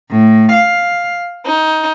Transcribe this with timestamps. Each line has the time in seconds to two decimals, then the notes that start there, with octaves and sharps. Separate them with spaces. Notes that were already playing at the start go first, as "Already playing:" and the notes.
0.11 A2
0.53 F5
1.46 D#4